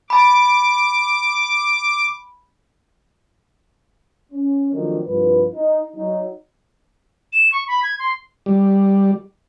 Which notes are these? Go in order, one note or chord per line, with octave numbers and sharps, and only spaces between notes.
A5 B5 D6
C#4
D#3 F3 F#3 A3 C4 D4
C2 G2 F3 B4
D#4
F#3 D#4
E7
C#6
B5
G#6
C6
G3